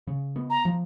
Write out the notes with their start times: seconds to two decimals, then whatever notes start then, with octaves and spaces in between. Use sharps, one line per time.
0.07 C#3
0.36 B3
0.50 A#5
0.65 F3